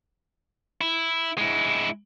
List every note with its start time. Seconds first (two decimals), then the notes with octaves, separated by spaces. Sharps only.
0.81 E4
1.38 G#3 E4